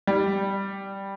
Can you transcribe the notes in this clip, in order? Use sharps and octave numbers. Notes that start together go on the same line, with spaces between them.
G3